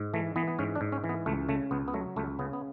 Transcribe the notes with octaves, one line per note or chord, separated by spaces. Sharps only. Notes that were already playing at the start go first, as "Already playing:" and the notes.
Already playing: G#2
E3 A3
E3 B3
B3
G#2 C#4
D4
G#2
C#4
E3
B3
C#2 A3
C#3 A3
C#2 B3
B3
F#3 A3
C#2 A3
C#3 B3
B3